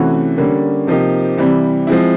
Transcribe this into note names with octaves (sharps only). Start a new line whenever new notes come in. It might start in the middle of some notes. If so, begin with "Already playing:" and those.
Already playing: C3 E3 A3 C#4 F#4
D3 G3 A#3 C#4
C3 F3 A#3 D#4 G4
C3 E3 G3 C4
F3 G#3 C4 E4